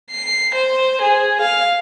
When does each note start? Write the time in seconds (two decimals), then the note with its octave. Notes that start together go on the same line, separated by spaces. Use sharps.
0.11 C7
0.54 C5
1.01 G#4
1.41 F5